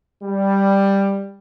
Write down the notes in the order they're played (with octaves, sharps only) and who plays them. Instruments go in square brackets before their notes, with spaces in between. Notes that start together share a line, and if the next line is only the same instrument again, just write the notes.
[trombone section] G3